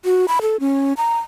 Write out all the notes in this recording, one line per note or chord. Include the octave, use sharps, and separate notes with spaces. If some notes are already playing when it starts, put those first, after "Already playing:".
F#4
B5
A4
C#4
A#5